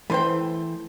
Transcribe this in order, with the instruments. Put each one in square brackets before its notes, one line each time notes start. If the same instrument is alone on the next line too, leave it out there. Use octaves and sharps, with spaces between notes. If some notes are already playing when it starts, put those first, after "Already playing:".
[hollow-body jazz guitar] E3 A3 [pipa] B4 C5 G5